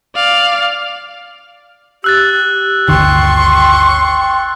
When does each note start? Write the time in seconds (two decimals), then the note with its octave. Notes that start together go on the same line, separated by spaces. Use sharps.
0.16 D5 F5
2.04 G4 E6 F#6 A6
2.89 G1 D2 D#3 G5 C6 C#6